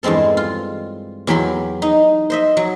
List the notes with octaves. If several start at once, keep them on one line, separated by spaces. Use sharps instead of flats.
E2 G2 G#3 C4 A4
F4
E2 F#3 G4 B5 C6
D#4
C5 D#5 E5
F#3